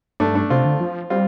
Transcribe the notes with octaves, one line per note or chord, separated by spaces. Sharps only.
G2 A3 D4
A3 D4
C3 C4 F4
D3
F3
G3 C4 F4